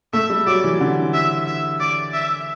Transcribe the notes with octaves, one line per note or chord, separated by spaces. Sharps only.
A3 E5
G3
F#3 D5
E3
D3
E5
E5
D5
E5